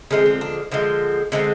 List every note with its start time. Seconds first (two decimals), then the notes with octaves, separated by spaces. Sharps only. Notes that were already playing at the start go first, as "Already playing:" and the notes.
0.11 D3 F3 G#3 C4 G#4
0.26 C4
0.41 D4
0.71 D3 F3 G#3 C4
1.32 D3 G#3 C4